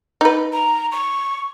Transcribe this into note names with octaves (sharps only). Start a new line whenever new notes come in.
D#4 B4
A#5
C#6